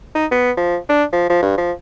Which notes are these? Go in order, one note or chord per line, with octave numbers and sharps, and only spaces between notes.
D#4
B3
F3
D4
F3
F3
G2
F3